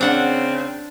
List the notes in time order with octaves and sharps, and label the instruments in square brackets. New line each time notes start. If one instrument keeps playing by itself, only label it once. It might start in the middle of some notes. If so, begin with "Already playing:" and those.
[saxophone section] C#3 C4 [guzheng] D4 F#5